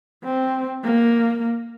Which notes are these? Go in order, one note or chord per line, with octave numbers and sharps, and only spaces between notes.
C4
A#3